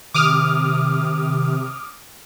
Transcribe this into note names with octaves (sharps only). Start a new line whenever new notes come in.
C3 D#3 D6 D#6 F6